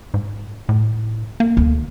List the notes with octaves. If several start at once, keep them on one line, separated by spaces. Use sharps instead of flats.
G#2
A2
A#3
D2